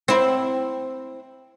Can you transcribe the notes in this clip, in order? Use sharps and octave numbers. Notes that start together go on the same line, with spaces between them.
C4 E4